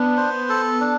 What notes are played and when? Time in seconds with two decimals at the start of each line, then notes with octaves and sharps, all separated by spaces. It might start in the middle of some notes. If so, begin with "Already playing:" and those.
Already playing: B3 D4
0.17 C5
0.49 A4
0.81 D4